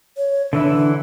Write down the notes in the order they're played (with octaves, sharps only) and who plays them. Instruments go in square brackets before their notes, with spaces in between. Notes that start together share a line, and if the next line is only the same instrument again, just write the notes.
[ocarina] C#5
[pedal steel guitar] D3 E3 E4 [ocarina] D4